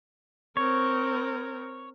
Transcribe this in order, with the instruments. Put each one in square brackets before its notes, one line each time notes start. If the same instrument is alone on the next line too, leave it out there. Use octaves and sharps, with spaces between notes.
[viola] C4 A#4 [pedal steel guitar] C#5